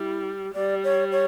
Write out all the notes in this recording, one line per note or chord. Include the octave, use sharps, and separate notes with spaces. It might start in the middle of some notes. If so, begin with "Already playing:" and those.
Already playing: G3 E4
G3 D5
C#5
C#5